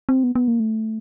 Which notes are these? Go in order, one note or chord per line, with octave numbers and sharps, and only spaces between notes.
C4
B3
B3
A#3
A3